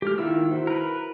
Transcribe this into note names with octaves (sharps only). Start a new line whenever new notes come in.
G#3 A3 G4 F6
D#3 A#3 E4 F4 E6
E4 F#4 C5
A#4 B4